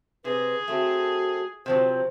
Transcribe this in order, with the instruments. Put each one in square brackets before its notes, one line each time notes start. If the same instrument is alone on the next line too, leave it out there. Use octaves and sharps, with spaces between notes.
[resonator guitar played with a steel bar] C3 [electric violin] G#4 [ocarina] B4
[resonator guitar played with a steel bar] A3 C4 [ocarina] F#4
[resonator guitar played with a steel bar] C3 F3 F#3 [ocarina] C5